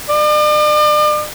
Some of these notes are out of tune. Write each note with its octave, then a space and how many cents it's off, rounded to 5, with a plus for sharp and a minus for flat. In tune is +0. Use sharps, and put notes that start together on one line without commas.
D5 +40